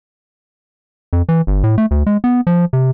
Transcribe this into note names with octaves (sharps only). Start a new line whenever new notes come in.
F2
E3
G1
A2
A3
D2
G#3
B3
F3
C3